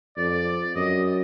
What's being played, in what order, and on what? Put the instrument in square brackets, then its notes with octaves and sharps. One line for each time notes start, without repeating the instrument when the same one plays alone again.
[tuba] F2 [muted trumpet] D5
[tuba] F#2 [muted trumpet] D#5